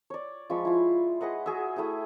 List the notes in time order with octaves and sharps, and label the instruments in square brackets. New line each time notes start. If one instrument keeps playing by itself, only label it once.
[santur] C#5 D5
F3 G#3 B5 C#6
E4 F4
G#4 B4 D#5 F#5
F#4 G#4 E5
A3 E4 G#4 G5